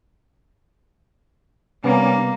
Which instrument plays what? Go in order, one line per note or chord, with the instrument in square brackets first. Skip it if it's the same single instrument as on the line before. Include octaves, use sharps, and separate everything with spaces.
[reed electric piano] C3 B3 [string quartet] G3 A#3 [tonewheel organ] C#4